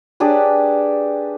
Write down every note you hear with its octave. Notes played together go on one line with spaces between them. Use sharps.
D4 G4 G#4 B4